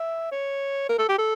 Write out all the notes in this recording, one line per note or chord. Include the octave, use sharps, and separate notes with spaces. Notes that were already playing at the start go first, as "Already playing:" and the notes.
Already playing: E5
C#5
A#4
A4
G4
A4